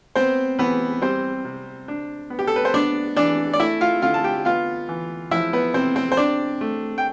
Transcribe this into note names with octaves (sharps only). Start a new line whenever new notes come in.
B3 C4 C5
E3 B3 B4
G3 C4 C5
C3
D4
B3
G4
A4
B4
C5
B3 D4 D5
E3 D4 D5
D5
A3 E4 E5
F4 F5
D3 F4 F5
A5
G4 G5
B3 F4 F5
E3
F3 E4 E5
B3 B4
C3 C4 C5
C4 C5
C5
C4 D4 D5
A3
G5